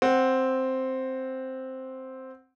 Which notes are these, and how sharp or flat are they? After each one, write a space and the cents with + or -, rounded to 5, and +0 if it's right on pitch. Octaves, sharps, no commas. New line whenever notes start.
C4 +0 F#5 +0